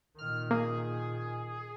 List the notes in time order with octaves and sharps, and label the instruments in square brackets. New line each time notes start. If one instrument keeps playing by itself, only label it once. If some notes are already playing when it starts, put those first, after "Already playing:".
[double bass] A#2 D#3 [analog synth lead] F6
[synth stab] A#3 [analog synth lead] G#4